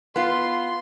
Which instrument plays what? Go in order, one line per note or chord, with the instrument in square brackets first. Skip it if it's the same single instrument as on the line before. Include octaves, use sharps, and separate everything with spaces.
[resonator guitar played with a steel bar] B3 F4 [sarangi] C6